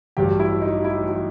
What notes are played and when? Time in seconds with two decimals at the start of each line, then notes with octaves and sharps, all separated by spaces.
0.17 A1 G2 F#3 G4
0.39 E4
0.62 D#4
0.84 E4
1.08 F#3